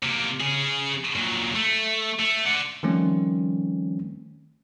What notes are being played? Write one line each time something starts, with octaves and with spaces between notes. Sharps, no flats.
C3 A#3
C#3 G#4
A#2 F#3
A3
A3
D5 F#5
D#3 F3 G3 A3 C4 C#4